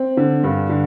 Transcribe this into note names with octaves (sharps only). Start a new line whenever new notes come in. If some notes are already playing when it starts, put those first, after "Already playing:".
Already playing: C4
D3
G2
D3